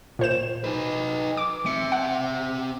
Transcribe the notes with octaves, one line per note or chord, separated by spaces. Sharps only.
A#2 C5 E7
D#4 B4
D6
C4 E5 C#7
F#5